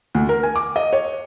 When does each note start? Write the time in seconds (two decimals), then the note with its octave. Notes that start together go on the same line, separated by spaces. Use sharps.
0.15 D2
0.29 A#4
0.43 G#5
0.56 D6
0.76 D#5
0.93 C#5